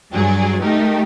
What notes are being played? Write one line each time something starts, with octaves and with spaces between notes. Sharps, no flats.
G2 F#3 G#4 D5
A3 D#4 G4 A#4